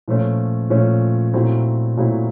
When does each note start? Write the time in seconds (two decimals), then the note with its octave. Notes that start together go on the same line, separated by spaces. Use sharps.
0.08 A#2 F3 A3 C#4
0.70 A#2 F3 A3 C#4
1.33 A#2 F#3 A3 C4 E4
1.97 A#2 F#3 A3 C4 E4